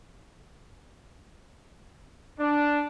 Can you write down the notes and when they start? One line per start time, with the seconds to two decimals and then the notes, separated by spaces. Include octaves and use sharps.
2.39 D4